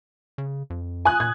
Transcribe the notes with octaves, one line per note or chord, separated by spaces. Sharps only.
C#3
F2
G#5 D#6 F#6
A#2 G#6